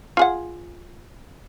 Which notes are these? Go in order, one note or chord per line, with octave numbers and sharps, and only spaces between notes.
F4 G#4 F#5